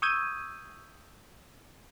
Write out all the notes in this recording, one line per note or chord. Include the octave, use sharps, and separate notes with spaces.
C#6 D#6 E6 G6 G#6 D#7